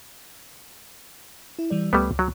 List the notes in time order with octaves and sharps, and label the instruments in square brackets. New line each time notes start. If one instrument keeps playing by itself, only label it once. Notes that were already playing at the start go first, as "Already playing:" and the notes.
[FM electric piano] E4
E3 G3 D5
[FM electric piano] C#2 [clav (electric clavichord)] G3 A3 B3
[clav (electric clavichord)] F#3